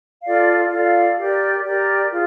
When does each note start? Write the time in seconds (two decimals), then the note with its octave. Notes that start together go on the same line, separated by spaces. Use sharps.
0.23 F4 A4 D5 F5
0.69 F4 A4 D5 F5
1.17 G4 A#4 D5
1.64 G4 A#4 D5
2.11 F4 G#4